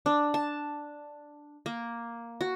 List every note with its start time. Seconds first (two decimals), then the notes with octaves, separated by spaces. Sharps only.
0.06 D4
0.34 A5
1.66 A#3
2.41 F#4